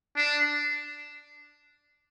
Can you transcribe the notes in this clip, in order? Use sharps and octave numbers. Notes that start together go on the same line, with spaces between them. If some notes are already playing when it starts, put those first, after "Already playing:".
D4